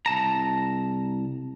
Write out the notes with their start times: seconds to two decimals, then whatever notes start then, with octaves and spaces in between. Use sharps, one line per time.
0.06 C2 A5 A#5